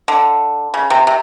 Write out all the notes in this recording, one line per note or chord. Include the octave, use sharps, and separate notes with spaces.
D3
C#3
C3
C3